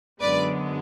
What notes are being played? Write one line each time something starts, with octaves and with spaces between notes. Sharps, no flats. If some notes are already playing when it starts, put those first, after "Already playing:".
F#2 D3 G#3 B3 B4 D5